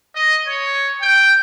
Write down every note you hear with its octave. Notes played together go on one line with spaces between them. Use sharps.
D#5
C#5
G5